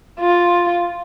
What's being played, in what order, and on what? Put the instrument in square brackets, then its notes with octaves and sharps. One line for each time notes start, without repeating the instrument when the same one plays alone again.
[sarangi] F4